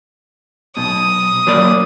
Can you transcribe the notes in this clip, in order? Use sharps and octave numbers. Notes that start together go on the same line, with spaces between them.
B1 B2 D#6
F#3 A#3 D5